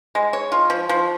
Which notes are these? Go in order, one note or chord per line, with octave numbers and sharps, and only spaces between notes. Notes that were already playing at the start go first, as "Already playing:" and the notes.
G#3
C#5
F4
F3
F3